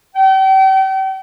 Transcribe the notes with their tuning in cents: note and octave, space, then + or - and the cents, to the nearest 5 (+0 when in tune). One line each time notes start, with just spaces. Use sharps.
G5 -40